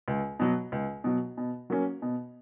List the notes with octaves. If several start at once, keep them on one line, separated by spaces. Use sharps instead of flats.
C#2
B2 F#3
C#2
B2 F#3
B2
F#3 A#3 C#4
B2